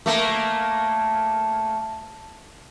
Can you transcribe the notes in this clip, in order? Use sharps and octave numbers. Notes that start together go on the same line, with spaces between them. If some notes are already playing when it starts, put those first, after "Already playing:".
A3 A#3